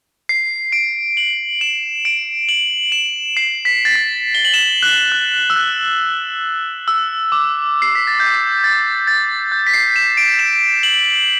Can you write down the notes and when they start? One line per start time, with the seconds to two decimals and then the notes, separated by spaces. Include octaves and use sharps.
0.29 C7
0.72 D7
1.17 F#7
1.61 E7
2.05 D7
2.49 F#7
2.92 E7
3.37 C7
3.65 B6
3.85 A6
3.96 B6
4.35 G7
4.45 F#7
4.54 E7
4.83 F#6
5.12 F#6
5.50 E6
5.56 F#6
6.88 E6
7.32 D6
7.82 C7
7.95 B6
8.07 A6
8.20 G6
8.64 A6
9.07 A6
9.52 G6
9.67 B6
9.74 C7
9.96 E7
10.17 D7
10.39 E7
10.83 F#7